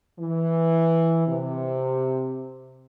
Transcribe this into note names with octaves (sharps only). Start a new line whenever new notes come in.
E3
C3